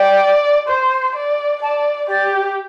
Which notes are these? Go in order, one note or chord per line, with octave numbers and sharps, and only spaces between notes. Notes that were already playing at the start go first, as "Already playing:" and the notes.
Already playing: D5 G5
C5
D5
D5 A5
G4 D5